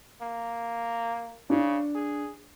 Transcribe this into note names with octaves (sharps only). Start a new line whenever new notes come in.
A#3
C#3 D4
G#4